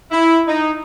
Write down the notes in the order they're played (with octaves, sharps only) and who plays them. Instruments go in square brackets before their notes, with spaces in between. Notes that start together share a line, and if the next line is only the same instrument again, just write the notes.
[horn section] E4
D#4